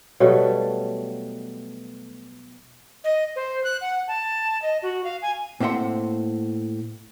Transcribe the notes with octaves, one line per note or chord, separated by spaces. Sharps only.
B2 F#3 G3 A3
D#5
C5
F#6
F#5
A5
D#5
F#4
F5
G#5
A2 A#3 C4 E5 F#5 C6